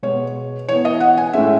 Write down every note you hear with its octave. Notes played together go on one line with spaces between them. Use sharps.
B2 G#3 B3 C#5
E3 B3 C#5
D#5
F#5
G#5
A2 G#3 C#4 E5